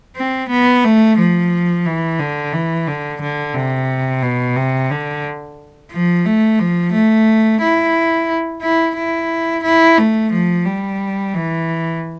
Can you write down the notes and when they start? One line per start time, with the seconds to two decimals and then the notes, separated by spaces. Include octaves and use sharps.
0.16 C4
0.49 B3
0.84 A3
1.18 F3
1.85 E3
2.19 D3
2.53 E3
2.87 D3
3.21 D3
3.54 C3
4.23 B2
4.56 C3
4.91 D3
5.91 F3
6.26 A3
6.60 F3
6.93 A3
7.61 E4
8.62 E4
8.96 E4
9.63 E4
9.98 A3
10.32 F3
10.65 G3
11.34 E3